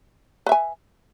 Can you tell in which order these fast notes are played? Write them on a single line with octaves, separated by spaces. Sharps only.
B4 E5 G#5